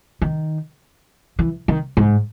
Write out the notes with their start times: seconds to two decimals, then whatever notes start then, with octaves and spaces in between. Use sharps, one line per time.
0.22 D#3
1.39 E3
1.68 D#3
1.97 G#2